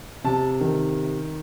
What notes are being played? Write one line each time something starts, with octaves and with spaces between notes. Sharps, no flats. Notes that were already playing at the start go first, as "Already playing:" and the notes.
C3 A5
D#3